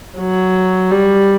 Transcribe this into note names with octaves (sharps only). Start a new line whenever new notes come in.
F#3
G3